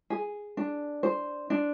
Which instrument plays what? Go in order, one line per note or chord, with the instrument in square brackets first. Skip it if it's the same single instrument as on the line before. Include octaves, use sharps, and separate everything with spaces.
[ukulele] G#4
D4
C5
D4